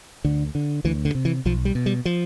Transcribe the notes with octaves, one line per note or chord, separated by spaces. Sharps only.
D2 D3
D3
D2 E3
D3
C3
E3
B1 F3
G3
B2
G3
F3